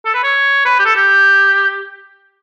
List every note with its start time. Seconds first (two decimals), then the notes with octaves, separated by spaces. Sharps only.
0.05 A4
0.14 B4
0.23 C#5
0.65 B4
0.79 G4
0.85 A4
0.96 G4